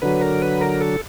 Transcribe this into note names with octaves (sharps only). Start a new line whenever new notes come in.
D3 F#3 B4
A#4
B4
A#4
A4